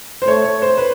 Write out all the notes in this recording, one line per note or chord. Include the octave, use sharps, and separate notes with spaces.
C5
A3 C#5
C#5
C5
B4